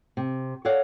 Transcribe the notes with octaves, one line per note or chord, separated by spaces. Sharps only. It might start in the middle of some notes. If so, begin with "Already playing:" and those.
C3
A4 C#5 D5 F5 F#5